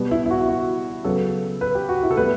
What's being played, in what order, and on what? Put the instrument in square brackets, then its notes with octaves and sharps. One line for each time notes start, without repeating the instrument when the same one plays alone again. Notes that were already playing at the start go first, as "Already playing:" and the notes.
Already playing: [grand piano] B2 G3 B3
E4
E4
F#4
E4
F#4
C#3 F#3 B3 A4
B4
G4
F#4
E4
A4
A2 G3 B3 B4